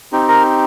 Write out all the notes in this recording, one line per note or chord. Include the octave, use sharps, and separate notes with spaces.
C4 D#4 G4
A#4 A#5